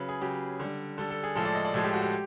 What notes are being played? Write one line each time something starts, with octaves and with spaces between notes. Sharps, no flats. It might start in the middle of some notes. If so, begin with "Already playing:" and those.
Already playing: C#3 F#3 B4
G#4
C#3 F#3 G4
D3 G3
D3 G3 A4
A4
G#4
A2 F3 G#3 A4
D5
D#5
D5
A2 F3 G#3
G4
F#4
G4